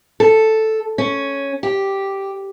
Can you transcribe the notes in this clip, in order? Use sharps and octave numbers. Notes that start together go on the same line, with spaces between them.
A4
C#4
G4